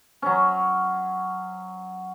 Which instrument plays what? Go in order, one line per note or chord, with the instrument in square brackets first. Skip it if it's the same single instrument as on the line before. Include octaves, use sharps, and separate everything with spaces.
[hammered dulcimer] F#3 C#4